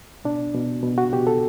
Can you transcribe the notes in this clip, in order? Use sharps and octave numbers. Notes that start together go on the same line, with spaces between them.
B2 D4
B2
B2
F#4
B2 G4
A4